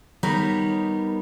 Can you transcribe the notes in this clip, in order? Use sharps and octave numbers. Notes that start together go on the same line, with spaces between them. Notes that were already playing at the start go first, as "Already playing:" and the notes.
G3 B3 D#4 A#4 C#5